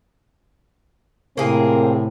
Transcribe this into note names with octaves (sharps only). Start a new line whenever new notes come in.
A2 C3 A#3 C4 G#4 A#4